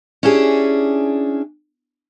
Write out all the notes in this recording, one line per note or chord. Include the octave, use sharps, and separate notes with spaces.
C#4 D4 E4 G4 G#4